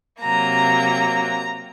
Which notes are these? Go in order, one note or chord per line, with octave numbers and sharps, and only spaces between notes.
C3 F#3 A#3 A#5